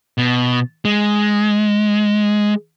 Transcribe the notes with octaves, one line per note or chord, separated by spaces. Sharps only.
B2
G#3